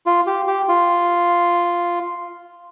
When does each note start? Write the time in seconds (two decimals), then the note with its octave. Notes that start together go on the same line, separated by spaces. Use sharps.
0.06 F4
0.27 G4
0.47 G4
0.68 F4